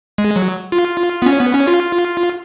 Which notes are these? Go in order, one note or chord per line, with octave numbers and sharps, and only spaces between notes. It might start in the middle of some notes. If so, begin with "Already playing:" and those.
G#3
F#3
F4
B3
C#4
B3
C#4
F4